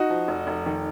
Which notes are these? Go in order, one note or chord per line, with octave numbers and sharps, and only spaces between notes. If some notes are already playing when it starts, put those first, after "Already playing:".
Already playing: D#4 F#4
F3
F1
F1
D#3